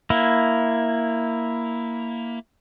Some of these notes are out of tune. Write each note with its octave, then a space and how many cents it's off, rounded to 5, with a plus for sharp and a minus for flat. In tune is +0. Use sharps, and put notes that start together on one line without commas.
A#3 +0 E4 +0